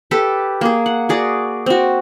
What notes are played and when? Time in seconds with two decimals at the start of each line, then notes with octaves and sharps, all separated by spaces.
0.11 G4 A4 B4
0.61 A#3 G#4
0.86 F#5
1.09 F#4 G#4 D5
1.66 C4 F#4